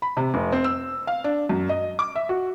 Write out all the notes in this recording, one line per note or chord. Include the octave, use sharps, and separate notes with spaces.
B5
C3
F1
C4
E6
F5
D4
F#2
D#5
D6
E5
F#4